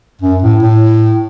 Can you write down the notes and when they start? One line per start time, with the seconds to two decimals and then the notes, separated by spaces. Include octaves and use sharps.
0.22 F#2
0.42 A2
0.62 A2